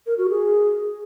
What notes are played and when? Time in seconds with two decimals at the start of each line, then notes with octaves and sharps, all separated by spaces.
0.07 A#4
0.18 F#4
0.29 G#4